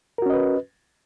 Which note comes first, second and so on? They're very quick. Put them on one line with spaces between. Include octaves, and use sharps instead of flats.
A#4 F#4 C#4 D#5 B4